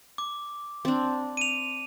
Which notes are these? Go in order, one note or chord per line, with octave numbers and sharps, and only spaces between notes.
D6
C4 D4
D#7 F7